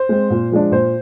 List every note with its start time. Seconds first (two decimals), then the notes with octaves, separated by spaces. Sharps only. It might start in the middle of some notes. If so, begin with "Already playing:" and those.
Already playing: C5
0.09 G#3 C4
0.30 A#2
0.52 F3 G#3 D4
0.71 A#2 C5